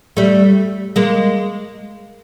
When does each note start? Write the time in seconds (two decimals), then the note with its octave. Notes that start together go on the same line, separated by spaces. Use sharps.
0.17 G3 A3
0.96 G#3 A#3